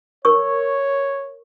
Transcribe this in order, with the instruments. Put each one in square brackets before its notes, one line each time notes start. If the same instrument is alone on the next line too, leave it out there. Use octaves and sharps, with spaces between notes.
[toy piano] A#4 C#6 [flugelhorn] C#5